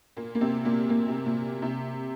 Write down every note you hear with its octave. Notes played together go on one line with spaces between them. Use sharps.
A#2 A#3
A#3
C3 C4
A#2 A#3
A#2 A#3
C3
A#2
C3